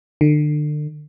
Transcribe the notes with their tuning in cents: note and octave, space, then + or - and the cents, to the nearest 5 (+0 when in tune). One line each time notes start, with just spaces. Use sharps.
D3 +35